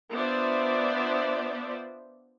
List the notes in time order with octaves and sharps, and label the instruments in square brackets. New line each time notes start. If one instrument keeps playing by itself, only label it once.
[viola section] B3 D4 F4 C5 D5 E5